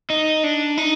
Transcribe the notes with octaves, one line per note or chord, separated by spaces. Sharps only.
D#4
D4
D#4